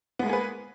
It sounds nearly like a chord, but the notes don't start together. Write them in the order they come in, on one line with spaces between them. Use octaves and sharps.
B3 G#3 A#3 G#4 B4